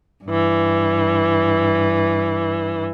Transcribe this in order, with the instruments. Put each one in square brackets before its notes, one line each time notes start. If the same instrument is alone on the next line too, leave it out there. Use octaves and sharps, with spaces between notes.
[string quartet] G2 E3